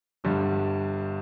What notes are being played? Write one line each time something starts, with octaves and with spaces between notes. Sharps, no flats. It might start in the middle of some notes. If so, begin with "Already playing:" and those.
G1 G2 D3 G3